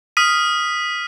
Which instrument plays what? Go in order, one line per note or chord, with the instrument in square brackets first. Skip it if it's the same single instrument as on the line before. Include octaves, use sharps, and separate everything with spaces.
[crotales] D#6 F6 B6 D#7